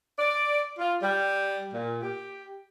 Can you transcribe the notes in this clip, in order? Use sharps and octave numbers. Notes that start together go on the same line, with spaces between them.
D5
F4
G3
A#2
G4